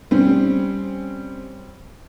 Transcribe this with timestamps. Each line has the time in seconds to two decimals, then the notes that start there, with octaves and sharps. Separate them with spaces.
0.11 G3 C4 C#4